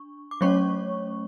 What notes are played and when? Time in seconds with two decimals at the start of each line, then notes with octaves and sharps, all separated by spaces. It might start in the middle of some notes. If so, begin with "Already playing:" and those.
Already playing: D4 C#6
0.31 D6
0.41 F#3 A3 C#4 C#5 C#6